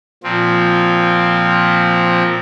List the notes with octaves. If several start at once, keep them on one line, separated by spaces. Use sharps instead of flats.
A#2 F3 C4